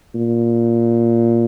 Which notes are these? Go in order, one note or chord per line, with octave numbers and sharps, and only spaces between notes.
A#2